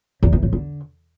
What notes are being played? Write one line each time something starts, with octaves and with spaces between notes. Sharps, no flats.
E2
E3
A2
D3